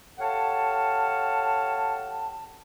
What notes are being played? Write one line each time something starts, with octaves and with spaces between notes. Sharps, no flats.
G4 A4 C#5 F5 F#5 A5